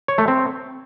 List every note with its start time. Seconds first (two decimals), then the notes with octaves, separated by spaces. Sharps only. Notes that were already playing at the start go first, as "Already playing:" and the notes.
0.08 C#5
0.18 A3
0.28 C4